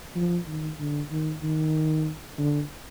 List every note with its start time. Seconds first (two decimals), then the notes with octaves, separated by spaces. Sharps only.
0.16 F3
0.48 D#3
0.79 D3
1.11 D#3
1.43 D#3
2.39 D3